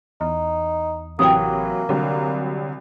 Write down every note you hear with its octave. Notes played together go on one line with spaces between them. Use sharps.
E2 D#4
A1 C3 E3 F#3 A#3 G5 D#6
C2 D3 F#3